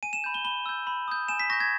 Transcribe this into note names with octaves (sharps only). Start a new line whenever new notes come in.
G#5 D#7
E7
B5 G6
G7
B5 G7
E6 G6
B5
D#6 G6
G#5 E7
B6
C#6 G6 A#6
G#6